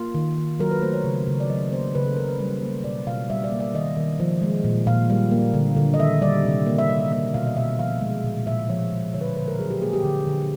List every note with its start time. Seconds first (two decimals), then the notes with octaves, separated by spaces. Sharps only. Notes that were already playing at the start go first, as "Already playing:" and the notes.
Already playing: A#3 F4
0.15 D#3
0.38 D#3
0.60 F#3 A#4
0.71 B4
0.82 A3 C5
0.93 C#5
1.04 C#3
1.27 C#3
1.40 D5
1.50 F#3 D#5
1.72 A#3 C5
1.95 C#3 B4
2.06 A4
2.17 C#3 A#4
2.29 B4
2.40 G3 A#4
2.62 A#3 C5
2.84 B2 D5
3.07 B2 F5
3.30 G3 E5
3.44 D5
3.52 A#3
3.60 D5
3.74 D#3 D#5
3.97 D#3
4.20 F3
4.42 G#3
4.64 A#2
4.87 A#2 F5
5.10 G3
5.31 A#3
5.54 D3
5.76 D3
5.94 D#5
5.99 D#3 E5
6.22 G3 D5
6.45 C3
6.66 A#3
6.78 E5
6.89 G3 D#5
7.12 A#3 E5
7.34 B2 F5
7.47 D#5
7.57 B2 E5
7.79 F3 F5
8.01 G#3
8.24 A#2
8.47 A#2 E5
8.69 F3 C#5
8.92 G#3
9.13 D3 C#5
9.21 B4
9.25 C5
9.37 D3 B4
9.48 A#4
9.59 F#3 G#4
9.71 G4
9.82 A#3 G#4
9.93 G4
10.03 D3
10.27 D3